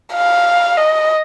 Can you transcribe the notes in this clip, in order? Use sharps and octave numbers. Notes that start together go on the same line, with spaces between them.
F5
D#5